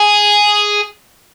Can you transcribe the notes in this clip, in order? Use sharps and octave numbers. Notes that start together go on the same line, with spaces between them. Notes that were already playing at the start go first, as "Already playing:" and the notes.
Already playing: G#4